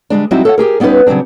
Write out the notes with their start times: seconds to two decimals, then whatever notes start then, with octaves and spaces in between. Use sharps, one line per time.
0.10 D3 G3 G#3 D4
0.31 F#3 G3 C4 D#4 E4 F#4
0.45 A4 C#5 F5 F#5
0.58 G4 G#4 A#4
0.80 G3 B3 C#4 D#4 B4
1.06 C#3 F#3 G3 C4 D4